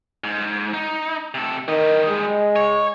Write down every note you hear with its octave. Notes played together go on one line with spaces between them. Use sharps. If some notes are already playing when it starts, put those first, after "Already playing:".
G#2
D#4
C3 A4
D#3 G3 D#5
G#3
C#5